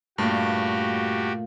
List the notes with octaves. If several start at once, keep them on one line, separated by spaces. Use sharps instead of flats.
G2 A#2 A3 F#4 G4